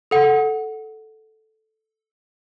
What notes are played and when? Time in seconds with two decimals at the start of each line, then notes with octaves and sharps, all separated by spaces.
0.11 A4 F#5